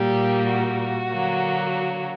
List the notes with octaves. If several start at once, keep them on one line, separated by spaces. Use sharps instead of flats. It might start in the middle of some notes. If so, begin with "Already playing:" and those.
Already playing: A#2 G3 A#3 G4
F#4
D3 F#3 A#3
F#4